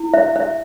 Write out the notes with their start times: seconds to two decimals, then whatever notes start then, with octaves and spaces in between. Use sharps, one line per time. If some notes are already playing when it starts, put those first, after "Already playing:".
Already playing: E4
0.14 E5
0.36 E5